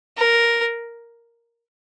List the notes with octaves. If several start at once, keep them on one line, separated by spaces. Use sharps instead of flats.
A#4